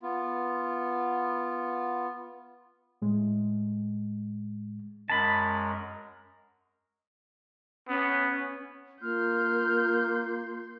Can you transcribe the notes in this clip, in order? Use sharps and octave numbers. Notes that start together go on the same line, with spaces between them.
B3 F4
A2 G#3
F#2 G#3 A#4 A5 B5
B3 C#4
A#3 F4 C6 F6 G6